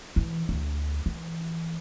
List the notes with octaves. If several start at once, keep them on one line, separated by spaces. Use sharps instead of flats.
E3
D2
E3